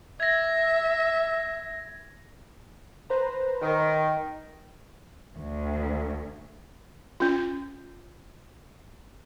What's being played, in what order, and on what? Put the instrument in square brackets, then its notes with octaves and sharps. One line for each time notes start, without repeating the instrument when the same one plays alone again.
[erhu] E5 [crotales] G#6 A#6
[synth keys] B4 C5 A#5
[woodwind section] D#3
[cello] D2
[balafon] C#4 F4